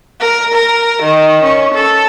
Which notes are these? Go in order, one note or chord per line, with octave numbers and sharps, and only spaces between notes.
A#4
A#4
D#3
C#4
A4